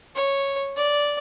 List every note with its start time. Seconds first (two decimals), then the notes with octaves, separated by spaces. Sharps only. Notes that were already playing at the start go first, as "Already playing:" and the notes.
0.16 C#5
0.77 D5